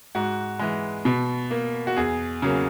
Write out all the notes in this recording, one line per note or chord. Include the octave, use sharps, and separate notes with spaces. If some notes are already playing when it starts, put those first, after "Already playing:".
G#2 F#4
E3 G#3
B2
A#3
F#4
E2 G#4
C#3 F#3 A#3